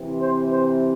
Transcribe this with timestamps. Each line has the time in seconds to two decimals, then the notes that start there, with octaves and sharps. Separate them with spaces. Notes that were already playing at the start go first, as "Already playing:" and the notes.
Already playing: C3 E3 C4
0.21 C5
0.52 C5